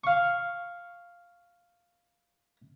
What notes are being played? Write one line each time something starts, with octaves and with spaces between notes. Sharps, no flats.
F5 C#6